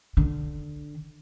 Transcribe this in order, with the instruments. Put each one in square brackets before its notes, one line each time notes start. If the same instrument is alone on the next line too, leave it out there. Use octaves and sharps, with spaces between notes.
[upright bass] D3